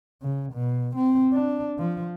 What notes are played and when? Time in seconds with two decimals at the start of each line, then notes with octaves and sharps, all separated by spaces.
0.22 C#3
0.53 B2
0.96 C4
1.33 D4
1.78 F3